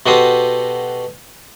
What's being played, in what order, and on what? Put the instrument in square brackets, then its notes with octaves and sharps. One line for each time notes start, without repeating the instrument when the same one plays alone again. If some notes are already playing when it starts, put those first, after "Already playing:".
[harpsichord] B2 F#4 G4 A4 C5 D#6